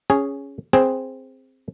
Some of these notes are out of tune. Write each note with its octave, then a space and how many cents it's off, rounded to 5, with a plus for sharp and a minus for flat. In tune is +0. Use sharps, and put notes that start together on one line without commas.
C#4 +0 G#4 +0
C4 +0 G#4 +0 B4 +25